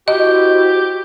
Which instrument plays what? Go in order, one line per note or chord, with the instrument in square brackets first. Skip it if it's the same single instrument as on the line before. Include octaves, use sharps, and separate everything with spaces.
[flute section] E4 F#4 C5 [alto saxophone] G4 [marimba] D#5